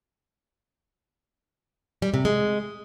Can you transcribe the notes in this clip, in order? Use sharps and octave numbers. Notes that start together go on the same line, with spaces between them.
G3
C3
G#3